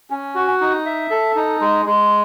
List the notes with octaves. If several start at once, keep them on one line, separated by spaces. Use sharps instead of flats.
C#4
F#4
D#4
E5
A4
D#4
G#3
G#3